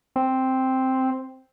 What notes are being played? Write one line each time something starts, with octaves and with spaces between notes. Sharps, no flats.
C4